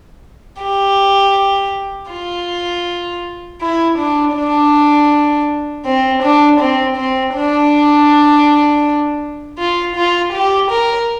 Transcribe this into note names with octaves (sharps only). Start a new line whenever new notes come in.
G4
F4
E4
D4
D4
C4
D4
C4
C4
D4
F4
F4
G4
A#4